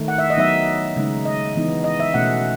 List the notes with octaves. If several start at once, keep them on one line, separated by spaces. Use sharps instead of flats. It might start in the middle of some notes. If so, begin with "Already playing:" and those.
Already playing: D#3 A3 D#4
F#5
E5
D#5
F#3 B3 D#4 E5
C#3 G#3 D#4
D#5
E3 B3 D#4
D#5
E5
B2 A3 C#4 F#5